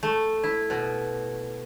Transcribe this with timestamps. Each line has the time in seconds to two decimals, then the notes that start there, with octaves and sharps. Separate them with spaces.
0.03 A3
0.43 E4
0.70 B2